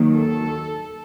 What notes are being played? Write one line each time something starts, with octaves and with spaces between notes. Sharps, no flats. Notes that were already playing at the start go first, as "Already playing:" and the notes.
Already playing: D#2 D#3 F#3
A4